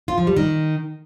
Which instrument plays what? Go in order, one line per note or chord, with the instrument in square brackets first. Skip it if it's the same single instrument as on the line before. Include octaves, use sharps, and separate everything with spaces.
[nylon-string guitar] F4
F3
G3
D#3